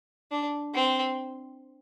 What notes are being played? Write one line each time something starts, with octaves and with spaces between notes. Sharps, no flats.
D4
C4